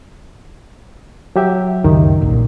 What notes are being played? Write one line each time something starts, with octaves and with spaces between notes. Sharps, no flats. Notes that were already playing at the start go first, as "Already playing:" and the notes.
F#3 G4 E5
C#2 F#2 D#3
A#1 A#2